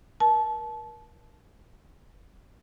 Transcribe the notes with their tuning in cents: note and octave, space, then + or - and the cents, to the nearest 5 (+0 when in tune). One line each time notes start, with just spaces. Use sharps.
A#4 +35 A5 -25